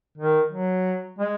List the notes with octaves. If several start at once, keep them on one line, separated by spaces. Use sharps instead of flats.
D#3
F#3
G#3